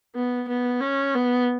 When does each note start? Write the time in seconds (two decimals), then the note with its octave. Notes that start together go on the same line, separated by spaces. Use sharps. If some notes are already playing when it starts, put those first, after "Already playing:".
0.15 B3
0.48 B3
0.81 C#4
1.14 B3